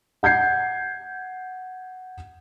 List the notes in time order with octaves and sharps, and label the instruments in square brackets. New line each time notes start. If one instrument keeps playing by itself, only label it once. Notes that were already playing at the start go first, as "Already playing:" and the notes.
[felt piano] F#5 G6 G#6 C7